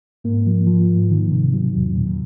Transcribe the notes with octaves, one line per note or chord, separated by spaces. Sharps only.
G#2 A#3
F3
F3
G#2
D#3
C3
F#3
E2
A#2